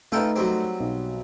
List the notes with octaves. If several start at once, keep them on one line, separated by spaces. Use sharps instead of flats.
A3 D#4 F4 A4 B4 G5
F#3 G3 C4
B1